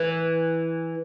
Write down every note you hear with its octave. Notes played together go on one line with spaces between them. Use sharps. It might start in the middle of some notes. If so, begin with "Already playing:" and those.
Already playing: E3